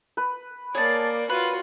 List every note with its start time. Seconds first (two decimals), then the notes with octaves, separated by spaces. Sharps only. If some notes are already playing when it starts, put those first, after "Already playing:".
0.17 B4
0.75 A#3 G#4 C#5 D5 A5
1.30 F4 F#4 B4